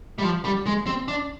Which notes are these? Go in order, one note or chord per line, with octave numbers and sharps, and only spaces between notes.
G3
F3
G3
G#3
C4
D4